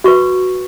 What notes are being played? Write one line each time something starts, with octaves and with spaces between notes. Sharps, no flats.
F#4 B4 C#6